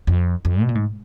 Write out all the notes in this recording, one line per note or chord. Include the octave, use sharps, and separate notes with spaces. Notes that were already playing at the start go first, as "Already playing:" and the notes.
F2
F2
B2
A#2
G#2